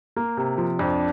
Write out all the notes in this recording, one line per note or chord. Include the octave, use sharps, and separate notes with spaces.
A#3
C3
F3
F2 D4